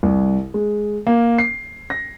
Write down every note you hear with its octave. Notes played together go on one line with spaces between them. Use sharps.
C2
G#3
A#3
C7
A#6